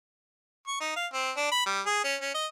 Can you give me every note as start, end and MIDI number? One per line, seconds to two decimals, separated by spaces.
0.67 0.78 85
0.81 0.96 63
0.96 1.07 77
1.13 1.31 60
1.37 1.51 62
1.52 1.66 83
1.66 1.81 55
1.86 2.04 68
2.04 2.16 61
2.21 2.33 61
2.34 2.46 75